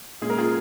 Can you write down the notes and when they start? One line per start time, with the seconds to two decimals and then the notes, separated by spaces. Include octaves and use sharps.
0.21 A#2 G#3 C#4 G#4
0.30 A#4
0.38 F4 G#4